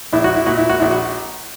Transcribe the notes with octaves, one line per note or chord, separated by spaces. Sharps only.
A#1 E4
F#4
E4
A#2 F#4
E4
F#4
A#1 E4
F#4